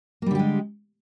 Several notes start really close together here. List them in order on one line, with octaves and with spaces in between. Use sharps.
A#3 G3 D3 G4 G#3